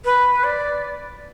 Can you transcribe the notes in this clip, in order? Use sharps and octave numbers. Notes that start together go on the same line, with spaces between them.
B4
D5